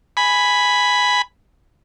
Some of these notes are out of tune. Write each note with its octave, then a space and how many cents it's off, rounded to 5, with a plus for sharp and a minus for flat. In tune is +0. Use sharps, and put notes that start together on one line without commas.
G#5 +0 B5 +0